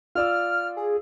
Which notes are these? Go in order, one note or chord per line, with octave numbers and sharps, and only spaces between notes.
F4 D5 E6 F6
G#4